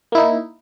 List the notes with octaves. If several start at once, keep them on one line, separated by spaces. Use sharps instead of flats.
A#3 D#4 E4